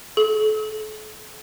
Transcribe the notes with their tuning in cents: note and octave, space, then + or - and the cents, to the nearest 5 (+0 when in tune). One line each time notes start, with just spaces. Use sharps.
A4 -40